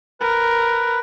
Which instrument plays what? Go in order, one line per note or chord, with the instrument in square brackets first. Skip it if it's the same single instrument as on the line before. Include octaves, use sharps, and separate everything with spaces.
[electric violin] A#4 [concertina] B4